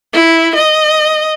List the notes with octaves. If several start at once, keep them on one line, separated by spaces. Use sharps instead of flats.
E4
D#5